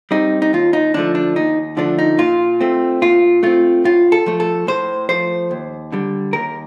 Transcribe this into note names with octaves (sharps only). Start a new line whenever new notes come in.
G3 C4 D#4
D#4
D#2 F4
D#4
D3 F3 A3 D4
D4
D#2 D#4
D3 F3 A3 D4
D#4
A#2 F4
A3 C4
A#2 F4
A3 C4 F4
A2 F4
A4
F3 A3
A4
A2 C5
F3 A3 C5
D#2
D3 G3
D#2 A#4